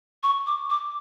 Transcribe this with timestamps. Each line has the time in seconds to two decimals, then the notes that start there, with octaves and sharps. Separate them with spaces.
0.23 C#6
0.46 D6
0.70 D6